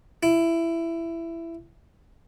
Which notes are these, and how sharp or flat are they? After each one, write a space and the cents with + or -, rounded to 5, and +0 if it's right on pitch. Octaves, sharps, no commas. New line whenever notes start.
E4 +15